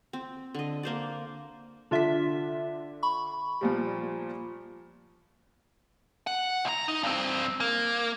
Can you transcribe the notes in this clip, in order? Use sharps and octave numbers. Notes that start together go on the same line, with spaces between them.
C4
D3 D#5
A#3 C5 D5
D3 D4 F4 E5 B6
B5 C#6
A#2 F3 G3
F#5
C2 A#5
D#4
G2 C4
A#3